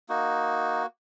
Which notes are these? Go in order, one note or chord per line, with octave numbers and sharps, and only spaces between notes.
A#3 D#4 F#4